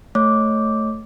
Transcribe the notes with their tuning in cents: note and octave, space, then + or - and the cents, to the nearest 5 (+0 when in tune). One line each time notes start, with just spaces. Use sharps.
A3 +0 C#5 +0 D6 -5